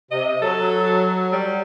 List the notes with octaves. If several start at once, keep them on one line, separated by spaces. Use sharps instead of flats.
C3 D#5
F#3 A4
G3